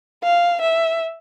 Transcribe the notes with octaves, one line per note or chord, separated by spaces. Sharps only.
F5
E5